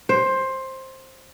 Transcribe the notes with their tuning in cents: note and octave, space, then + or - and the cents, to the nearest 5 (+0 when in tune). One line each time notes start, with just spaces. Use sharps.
C5 +15